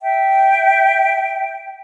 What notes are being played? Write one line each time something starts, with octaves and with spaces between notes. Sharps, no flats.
E5 G5